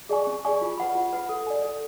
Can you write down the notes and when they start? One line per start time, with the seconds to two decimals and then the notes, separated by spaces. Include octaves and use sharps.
0.09 G#4 D5 G#5 C#6
0.27 C#4
0.45 G#4 D5 G#5 C#6
0.61 F4
0.78 B4 F#5 B5
0.95 F4
1.13 B4 F#5 B5
1.29 A4
1.47 D5 G#5
1.63 A4